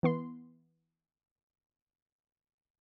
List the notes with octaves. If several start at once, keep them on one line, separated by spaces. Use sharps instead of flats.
E3 B3 C6